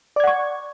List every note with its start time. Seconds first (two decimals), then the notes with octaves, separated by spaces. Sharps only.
0.16 D5
0.20 G#6
0.24 F#5
0.27 C#6